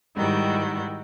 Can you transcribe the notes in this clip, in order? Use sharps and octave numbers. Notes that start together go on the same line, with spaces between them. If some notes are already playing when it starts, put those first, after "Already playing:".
G#2 D#3 G3 E4 F#4 G6